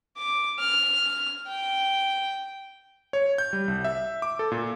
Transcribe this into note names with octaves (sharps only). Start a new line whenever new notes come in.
D6
F6
G5
C#5
G6
G3
C2
E5
D6
A4
A#2